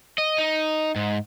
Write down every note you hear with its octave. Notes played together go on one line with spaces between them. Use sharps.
D#5
D#4
G#2